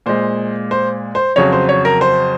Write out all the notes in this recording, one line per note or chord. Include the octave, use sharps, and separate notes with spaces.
A#2 G#3 C5
C5
C5
F2 C#3 F#3 C#5
C5
C#5
A#4
C5